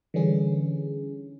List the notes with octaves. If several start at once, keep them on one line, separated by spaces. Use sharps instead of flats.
D3 E3 G3 C#4 G#4